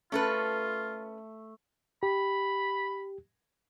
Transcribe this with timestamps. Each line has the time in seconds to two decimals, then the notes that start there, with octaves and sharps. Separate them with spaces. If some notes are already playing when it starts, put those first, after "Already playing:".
0.12 A3 C#4 F4 A4 B4
2.03 G4 B5